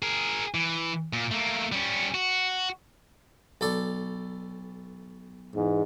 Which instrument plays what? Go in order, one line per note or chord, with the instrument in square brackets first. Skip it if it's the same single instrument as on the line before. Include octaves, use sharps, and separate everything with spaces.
[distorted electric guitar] G#4 A#4
E3
A#2
A3 A#3
G3 C#4
F#4
[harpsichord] B1 A4 D5
[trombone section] E2 G#2